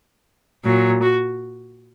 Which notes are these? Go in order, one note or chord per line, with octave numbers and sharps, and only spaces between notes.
A#2 F#3
F#4